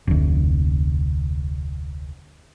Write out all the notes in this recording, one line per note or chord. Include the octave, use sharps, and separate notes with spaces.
F1 D2